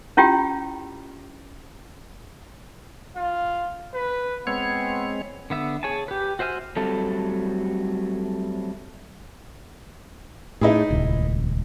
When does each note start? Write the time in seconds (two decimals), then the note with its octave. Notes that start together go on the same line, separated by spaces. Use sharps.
0.17 C#4 E4 F4 G4 G5
3.17 F4
3.94 B4
4.47 G#3 B3 C4 C#5
5.50 D3 B3 E5
5.83 G#4 C#5 G#5 A5
6.08 G4 B4
6.39 F#4 C5 E5 G#5 F6
6.77 F#3 G3 A3 C4 A4
10.61 A2 D#4 E4 G#4
10.90 D#1 C#2